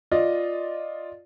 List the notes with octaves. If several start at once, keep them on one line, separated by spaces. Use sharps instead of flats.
F4 D5 D#5